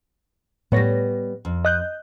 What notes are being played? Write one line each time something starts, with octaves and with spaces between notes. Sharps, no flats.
A2 G3 B3 C#5 A#6
F2
D#5 F#6 G6